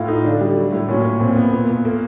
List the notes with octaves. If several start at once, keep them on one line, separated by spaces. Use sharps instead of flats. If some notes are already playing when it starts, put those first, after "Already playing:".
Already playing: A2 F4
A3 D#4
D3 D4
G3
F#3
A2
A#2 C#4
A#2
A#2 C4
A#2 B3
A#2
A#2
A3 A#3